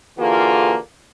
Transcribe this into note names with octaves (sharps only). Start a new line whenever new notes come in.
D3 E3 A#3 F4 F#4 G#4